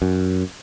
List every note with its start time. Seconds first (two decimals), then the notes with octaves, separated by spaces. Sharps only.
0.02 F#2